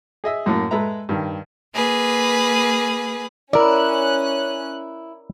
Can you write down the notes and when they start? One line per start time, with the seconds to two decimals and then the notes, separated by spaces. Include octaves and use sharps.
0.24 G#4 D#5 E5
0.46 F#2 A2 A#3
0.71 G#3 A4 B4 E5 A#5
1.09 G2 D#3
1.74 A#3 G#4 B4
3.53 C#4 E4 A#4 D5 F#6